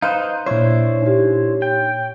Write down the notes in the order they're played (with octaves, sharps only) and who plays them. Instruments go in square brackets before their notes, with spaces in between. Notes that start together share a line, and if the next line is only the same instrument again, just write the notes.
[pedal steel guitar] D#4 B4 C5 [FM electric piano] F5
[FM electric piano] A#2 C#5 [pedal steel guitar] D4 E4 C5
[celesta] D#4 G4
[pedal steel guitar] G5